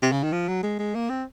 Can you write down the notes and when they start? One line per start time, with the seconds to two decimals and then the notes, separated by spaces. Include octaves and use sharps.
0.02 C3
0.12 C#3
0.23 D#3
0.32 F3
0.48 F#3
0.63 G#3
0.79 G#3
0.95 A#3
1.10 C4